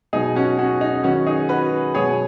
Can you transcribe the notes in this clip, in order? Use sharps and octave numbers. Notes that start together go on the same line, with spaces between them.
B2 F#3 B3 D#4 G#4
C#4 F#4
C#4 F#4
D#4
D#3 F#3 B3 C#4 F#4
D#4 G#4
F#4 B4
B2 F#3 B3 G#4 C#5